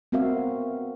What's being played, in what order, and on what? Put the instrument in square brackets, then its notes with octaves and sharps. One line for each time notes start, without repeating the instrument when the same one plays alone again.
[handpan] B3 C4 F#4 A#4 E5 F5